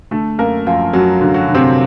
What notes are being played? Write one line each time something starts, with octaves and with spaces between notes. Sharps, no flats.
D3 A3 A4
F#2 A#3 A#4
F#2 F3 F4
F#2 F#3 F#4
D3
F#3 F#4
D3
C3 C4